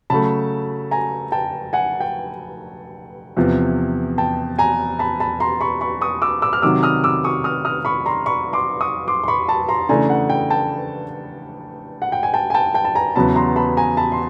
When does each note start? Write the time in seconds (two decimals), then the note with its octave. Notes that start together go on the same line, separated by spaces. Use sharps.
0.10 C#3 F#3 A3 A5 B5
0.91 G#5 A#5
1.32 G5 A5
1.73 F#5 G#5
2.00 G5
3.37 E2 C3 F3
4.18 G5 A5
4.59 G#5 A#5
4.99 A5 B5
5.20 A5 B5
5.40 A#5 C6
5.61 B5 C#6
5.81 B5 C#6
6.01 C#6 D#6
6.22 D6 E6
6.42 D6 E6
6.53 F6
6.62 C3 D#3 F#3 D6 E6
6.83 D#6 F6
7.04 D6 E6
7.24 C#6 D#6
7.44 D#6 F6
7.65 D#6 F6
7.85 B5 C#6
8.06 A#5 C6
8.26 B5 C#6
8.53 C6 D6
8.81 C#6 D#6
9.08 C6 D6
9.24 C6
9.28 B5 C#6
9.48 A5 B5
9.69 A#5 C6
9.89 C#3 E3 A3 D4 G#5 A#5
10.10 F#5
10.30 G5
10.50 G5 A5
12.02 F#5
12.12 G5
12.23 G#5
12.34 G5 A5
12.50 G#5
12.54 G5 A5
12.74 G5 A5
12.85 A5
12.95 G#5 A#5
13.15 E2 C#3 F#3 B3 A5 B5
13.35 A#5 C6
13.56 A5 B5
13.77 G#5 A#5
13.97 A5 B5
14.12 C6